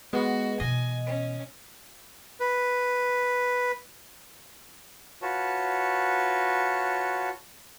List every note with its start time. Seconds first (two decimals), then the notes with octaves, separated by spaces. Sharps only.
0.13 G#3 B3 F#4
0.60 B2 E3 D#5 G#5
1.06 C#4
2.40 B4
5.22 F4 F#4 B4 C#5 A5